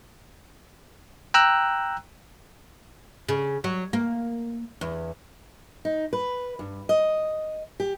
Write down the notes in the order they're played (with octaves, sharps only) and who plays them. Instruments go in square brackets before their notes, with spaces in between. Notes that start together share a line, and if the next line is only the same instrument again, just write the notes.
[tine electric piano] G5 A#5 E6 F#6
[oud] C#3
F#3
A#3
E2
[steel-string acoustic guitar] D#4
B4
G2
D#5
G4